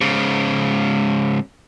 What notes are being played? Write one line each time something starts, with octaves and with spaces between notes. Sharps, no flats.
G#2 C#3